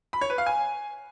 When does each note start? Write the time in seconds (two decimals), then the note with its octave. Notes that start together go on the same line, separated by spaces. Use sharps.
0.13 B5
0.21 C#5
0.30 B4
0.38 F5
0.46 G#5